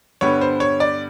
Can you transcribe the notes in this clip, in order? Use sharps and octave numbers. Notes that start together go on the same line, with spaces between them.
G2 D3 G3 B3 C#5
C5
C#5
D5